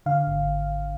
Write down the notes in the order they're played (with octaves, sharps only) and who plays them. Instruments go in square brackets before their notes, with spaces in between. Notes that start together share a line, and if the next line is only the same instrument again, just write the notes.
[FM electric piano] D3 F5
G#1